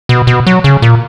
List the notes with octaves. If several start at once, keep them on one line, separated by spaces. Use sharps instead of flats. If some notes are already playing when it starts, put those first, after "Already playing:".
B2
B2
F#3
C#3
A#2